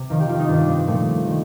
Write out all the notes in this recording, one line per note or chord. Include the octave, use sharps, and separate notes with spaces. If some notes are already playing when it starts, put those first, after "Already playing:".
Already playing: C3
F2 D#3 F4
G4
F4
D#4
G2 D#3 D4
D4
C4
A#2 F3 A3
D#3